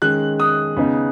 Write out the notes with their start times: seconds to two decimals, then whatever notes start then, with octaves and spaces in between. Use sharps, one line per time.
0.02 D#3 G#3 C#4 F#6
0.40 D#6
0.77 C#3 B3 D#4